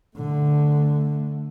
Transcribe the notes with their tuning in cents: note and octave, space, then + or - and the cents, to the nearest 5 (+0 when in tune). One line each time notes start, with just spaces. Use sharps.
D3 +0 A3 +0